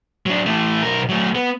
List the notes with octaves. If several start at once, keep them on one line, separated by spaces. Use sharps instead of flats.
F#3 D4
E3 A3
B1 A#4
F#3 A3
B3